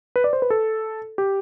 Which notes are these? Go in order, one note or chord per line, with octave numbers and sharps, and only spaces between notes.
B4
D5
C5
B4
A4
G4